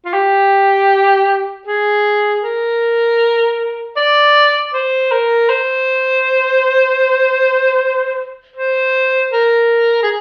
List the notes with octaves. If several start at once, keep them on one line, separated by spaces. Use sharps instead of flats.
F4
G4
G#4
A#4
D5
C5
A#4
C5
C5
A#4
G#4